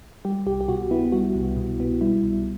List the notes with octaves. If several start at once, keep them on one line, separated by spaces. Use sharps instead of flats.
G3 G4
C2 G4
G4
B2 F#4
B3 E4
G3 F#4
C2
B2
B3
G3 E4
C2